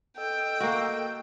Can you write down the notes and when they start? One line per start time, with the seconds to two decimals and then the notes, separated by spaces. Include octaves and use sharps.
0.18 A4 D#5 G5 E6
0.60 A#3 F#4